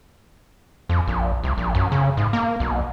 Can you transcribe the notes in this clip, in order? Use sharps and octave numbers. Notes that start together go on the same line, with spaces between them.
F2
A#1
C2
A#1
F#2
C#3
G#2
A#3
B1